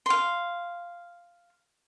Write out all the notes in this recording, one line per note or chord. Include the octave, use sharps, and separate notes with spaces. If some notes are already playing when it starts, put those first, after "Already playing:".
F5 C6